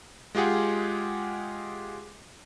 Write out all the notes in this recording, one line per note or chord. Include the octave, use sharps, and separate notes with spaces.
G#3 F4 G4 G#4 F#5